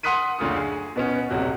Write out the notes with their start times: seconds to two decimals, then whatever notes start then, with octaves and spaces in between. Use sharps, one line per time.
0.03 F#5 C6 D#6 F#6 B6 D#7
0.39 F#1 D2 F4 D#6
0.56 G#4
0.96 B2 B3 C#4
1.30 D#1 B1 C3 F#4